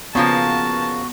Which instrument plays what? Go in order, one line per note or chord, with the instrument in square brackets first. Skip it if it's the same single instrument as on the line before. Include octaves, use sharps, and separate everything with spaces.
[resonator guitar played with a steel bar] C#3 F3 A#3 [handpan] B3 [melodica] F#4 [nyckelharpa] A5